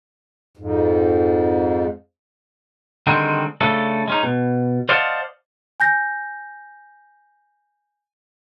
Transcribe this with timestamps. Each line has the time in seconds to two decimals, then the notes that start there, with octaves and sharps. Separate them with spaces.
0.57 F2 G#2
3.07 D3 D#3 G3 G#3 C4
3.61 C#3 A3 D4 A4
4.08 G#3 C#4 D#4
4.23 B2
4.89 C5 D5 D#5 F5 F#5 A5
5.80 G#5 G6 A#6